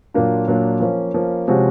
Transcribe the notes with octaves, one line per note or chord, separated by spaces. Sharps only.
A#2 F#3 A#3 D4 F4
A#2 F#3 A#3 D4 F4
F3 A#3 C#4
F3 A#3 C#4
C3 F3 G#3 C#4 F#4